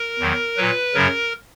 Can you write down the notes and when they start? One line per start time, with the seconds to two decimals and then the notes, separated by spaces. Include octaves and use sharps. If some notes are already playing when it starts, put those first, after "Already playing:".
Already playing: A#4
0.20 E2 D#3 F#3
0.57 A#2 F#3 B4
0.94 F#2 C#3 F#3 A#4